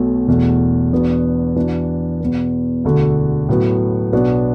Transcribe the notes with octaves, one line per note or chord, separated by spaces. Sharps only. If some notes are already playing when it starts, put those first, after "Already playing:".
Already playing: B1 B2 A3 F#4
E1 E2 B2 A3
E2 B2 B3 D4 F#4
E2 E3 D4 F#4
E2 B2 B3
E1 D2 D3 A3 F#4
A2 F#3 B3 F#4
B1 B2 B3 D4 F#4